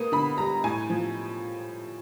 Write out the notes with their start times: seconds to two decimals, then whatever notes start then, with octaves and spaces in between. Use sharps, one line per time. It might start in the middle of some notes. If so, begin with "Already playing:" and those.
Already playing: A#3 B3 D#6
0.12 D3 B5
0.38 G3 A#5
0.64 A2 G#5
0.90 F3